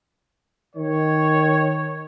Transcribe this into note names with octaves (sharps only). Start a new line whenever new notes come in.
D#3 C#5